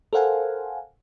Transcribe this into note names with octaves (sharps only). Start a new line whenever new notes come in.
A4 A#4 C5 F5 F#5 G#5